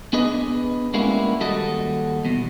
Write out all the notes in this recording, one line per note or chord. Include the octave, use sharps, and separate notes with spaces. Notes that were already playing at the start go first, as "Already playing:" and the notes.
B3 D4 G#4 B4 D#5
G3 G#3 A#3 B3 C#4 E4
D#2 G3 F#4 A4 D#5
E2 B2